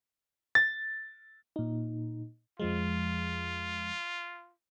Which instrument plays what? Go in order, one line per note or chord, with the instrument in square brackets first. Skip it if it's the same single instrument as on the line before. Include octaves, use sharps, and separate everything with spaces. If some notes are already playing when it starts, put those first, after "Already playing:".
[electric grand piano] A6
[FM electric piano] A#2 D#4
[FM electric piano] F2 F3 G#3 [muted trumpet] F4